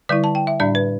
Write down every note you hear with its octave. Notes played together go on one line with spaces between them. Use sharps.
D3 G3 E4 D5
A5
G5
E5
A2 G3 D4 D5
B4